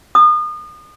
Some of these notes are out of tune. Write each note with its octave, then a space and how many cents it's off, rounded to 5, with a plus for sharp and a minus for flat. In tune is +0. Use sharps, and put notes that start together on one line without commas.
D#6 -35